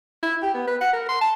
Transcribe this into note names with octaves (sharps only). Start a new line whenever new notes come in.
E4
G4
B3
B4
F#5
A#4
C6
A5